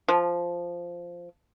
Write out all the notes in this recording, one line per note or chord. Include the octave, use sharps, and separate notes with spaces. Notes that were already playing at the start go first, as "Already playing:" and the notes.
F3